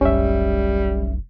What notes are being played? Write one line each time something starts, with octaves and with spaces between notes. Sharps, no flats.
F1 B1 G3 C#4 E5